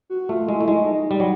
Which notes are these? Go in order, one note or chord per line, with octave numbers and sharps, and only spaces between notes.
F#4
A3 F4
G#3 E4
A3
G#3 D#4
G3
F#3